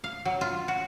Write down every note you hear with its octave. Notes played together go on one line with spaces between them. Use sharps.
F5
F#3
F4
F#4